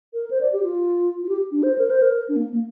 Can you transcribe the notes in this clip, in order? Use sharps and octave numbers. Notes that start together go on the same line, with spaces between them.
A#4
C5
D5
G4
F4
F4
G4
D4
C5
A#4
C5
A#4
D4
A#3
A#3